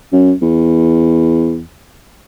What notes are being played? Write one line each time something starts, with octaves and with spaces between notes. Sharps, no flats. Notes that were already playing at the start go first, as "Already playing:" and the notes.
F#2
E2